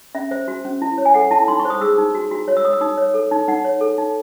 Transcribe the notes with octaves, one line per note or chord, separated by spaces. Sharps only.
C#4 E5
C5 E5
F#4
C#4
E4
C#5
G#5
A4 F#5
E4 A5
D#4 C6
C#6
C5
D#6
G#4 E6
D#4
F#4
F#4
C#5
E6
C#5 D#6
E6
D#4 D#6
C#5
A4
D#4
D#4 F#5
C#5
A4
D#4